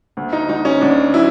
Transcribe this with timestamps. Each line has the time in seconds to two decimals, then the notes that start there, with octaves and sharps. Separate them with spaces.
0.17 D2
0.33 D#4
0.49 D2 D#4
0.65 C#4
0.81 D2 D4
1.14 F#3 E4